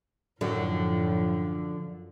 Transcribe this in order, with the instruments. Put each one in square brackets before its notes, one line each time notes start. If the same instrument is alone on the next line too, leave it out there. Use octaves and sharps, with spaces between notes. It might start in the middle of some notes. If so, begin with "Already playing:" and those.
[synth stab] F#2 [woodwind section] A2 [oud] D3 [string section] F3